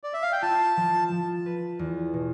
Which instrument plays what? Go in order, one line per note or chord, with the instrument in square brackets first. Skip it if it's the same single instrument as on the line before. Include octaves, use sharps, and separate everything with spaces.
[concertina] D5
E5
F5
G5
[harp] F4 [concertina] A5
[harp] F3
F3
B4
E2
B2